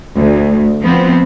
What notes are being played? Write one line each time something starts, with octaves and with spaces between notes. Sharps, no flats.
D2
F3 B3 C4